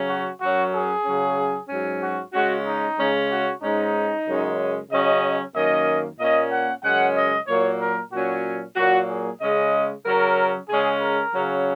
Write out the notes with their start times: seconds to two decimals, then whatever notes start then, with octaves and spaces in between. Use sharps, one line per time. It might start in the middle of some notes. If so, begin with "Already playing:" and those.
Already playing: C#3 F#3 C#4
0.09 F#4
0.41 F#2 F#3 C#4 F#4
0.73 G#4
1.05 C#3 F#3 C#4
1.69 G#2 F#3 C#4
2.01 F#4
2.34 C#3 G#3 C#4 F#4
2.66 D#4
2.98 C#3 G#3 C#4
3.30 F#4
3.62 G#2 G#3 C#4 D#4
4.27 F#2 C#3 G#3 C#4
4.91 C#3 F#3 C#4 D#5
5.55 F#2 D#3 A#3 C#4 D#5
6.19 A#2 A#3 C#4 D#5
6.51 F#5
6.84 F#2 C#3 G#3 C#4 F#5
7.16 D#5
7.48 A#2 F#3 A#3 C#5
7.80 A#4
8.12 A#2 F#3 C#4 F#4
8.76 A#2 F#3 A#3 F#4
9.09 G#4
9.41 C#3 G#3 C#4 D#5
10.05 C#3 F#3 C#4 A#4
10.69 C#3 G#3 C#4 G#4
11.01 A#4
11.34 C#3 F#3 C#4